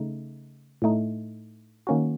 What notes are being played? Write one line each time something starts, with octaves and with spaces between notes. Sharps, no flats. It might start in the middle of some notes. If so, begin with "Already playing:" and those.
Already playing: C#3 A3 D#4
A2 A3 D#4
D#3 A#3 C#4 F#4